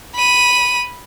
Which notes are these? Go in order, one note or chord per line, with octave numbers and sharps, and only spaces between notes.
B5 D#7